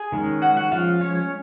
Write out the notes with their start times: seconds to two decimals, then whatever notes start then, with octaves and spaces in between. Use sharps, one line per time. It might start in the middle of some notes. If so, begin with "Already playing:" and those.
Already playing: G#4 G#5
0.12 D#3 G#3 C#4
0.42 F#4 F#5
0.56 F#4 F#5
0.72 F3 G#3 C#4 F4 F5
1.01 C#4 C#5